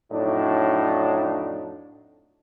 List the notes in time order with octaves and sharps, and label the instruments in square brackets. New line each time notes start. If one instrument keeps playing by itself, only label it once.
[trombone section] F2 A2 F#3 D4 D#4